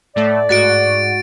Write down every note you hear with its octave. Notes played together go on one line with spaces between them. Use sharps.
A2 A3 D5
G#2 F#4 A6 D7